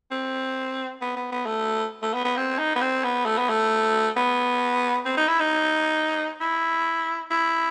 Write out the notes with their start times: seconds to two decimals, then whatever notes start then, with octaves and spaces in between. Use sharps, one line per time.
0.11 C4
1.01 B3
1.16 B3
1.32 B3
1.46 A3
2.02 A3
2.14 B3
2.25 B3
2.37 C4
2.58 D#4
2.76 B3
2.81 C4
3.04 B3
3.26 A3
3.38 B3
3.49 A3
4.16 B3
5.05 C4
5.17 D#4
5.28 E4
5.40 D#4
6.40 E4
7.31 E4